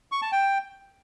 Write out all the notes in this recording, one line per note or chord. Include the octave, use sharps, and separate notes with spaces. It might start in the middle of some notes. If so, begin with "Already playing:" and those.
C#6
A5
G5